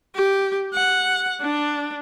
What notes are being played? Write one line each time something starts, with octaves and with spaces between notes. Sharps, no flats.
G4
F#5
D4